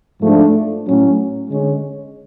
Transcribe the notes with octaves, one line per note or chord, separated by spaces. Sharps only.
G#2 F3 A3 D4
A2 F#3 C#4
D3 G#3 C#4